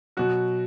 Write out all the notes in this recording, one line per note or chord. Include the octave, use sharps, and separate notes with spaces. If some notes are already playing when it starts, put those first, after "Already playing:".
B2 F#3 F#4